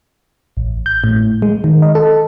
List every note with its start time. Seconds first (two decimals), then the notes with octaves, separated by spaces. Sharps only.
0.57 A1
0.86 G6
1.04 A2
1.42 G#3
1.64 D#3
1.82 D#5
1.95 A4